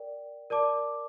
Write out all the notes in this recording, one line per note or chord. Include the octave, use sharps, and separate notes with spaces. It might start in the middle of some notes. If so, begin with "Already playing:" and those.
Already playing: A#4 D5 G5
A#4 D5 A5 D6